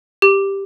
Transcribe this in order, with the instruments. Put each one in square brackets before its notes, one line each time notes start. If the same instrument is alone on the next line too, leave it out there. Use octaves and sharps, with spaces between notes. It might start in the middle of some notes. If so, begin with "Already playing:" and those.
[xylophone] G4